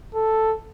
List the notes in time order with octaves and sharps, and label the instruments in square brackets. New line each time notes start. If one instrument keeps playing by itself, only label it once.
[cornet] A4